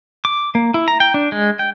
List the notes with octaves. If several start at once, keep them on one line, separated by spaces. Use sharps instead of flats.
D6
A#3
E4
A#5
G5
D4
G#3
G5